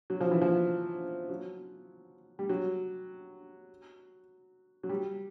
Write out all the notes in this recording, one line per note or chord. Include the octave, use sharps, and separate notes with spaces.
F#3
F3
E3
F3
F#3
G3
F#3
F#3
G3